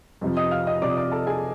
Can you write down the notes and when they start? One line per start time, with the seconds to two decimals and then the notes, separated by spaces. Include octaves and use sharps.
0.21 F2 C3 F3
0.37 D#5 D#6
0.51 F5 F6
0.67 D#5 D#6
0.81 F2 C3 F3 D5 D6
0.90 D#6
0.97 D5 D6
1.12 A4 A5
1.27 G#4 G#5